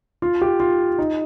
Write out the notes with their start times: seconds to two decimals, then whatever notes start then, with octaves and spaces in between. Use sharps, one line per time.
0.22 F4
0.42 G4
0.60 F4
0.98 D#4